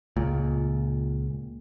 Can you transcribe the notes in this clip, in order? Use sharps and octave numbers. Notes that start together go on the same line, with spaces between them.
C#2 A#2